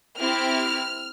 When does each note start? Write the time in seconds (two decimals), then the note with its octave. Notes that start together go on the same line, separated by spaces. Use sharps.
0.18 C4 E4 G4 F6